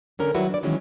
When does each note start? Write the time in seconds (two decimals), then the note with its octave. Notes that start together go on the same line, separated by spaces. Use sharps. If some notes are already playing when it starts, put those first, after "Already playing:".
0.19 D3 C#4 A#4
0.35 D#3 F#3 G3 E4 F#4 B4
0.50 D4 D5
0.63 D#3 E3 F#3 G#3 C#4 E4